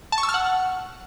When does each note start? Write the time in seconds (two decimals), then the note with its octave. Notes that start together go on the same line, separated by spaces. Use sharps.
0.12 A5
0.18 C#6
0.23 E6
0.29 F6
0.34 F#5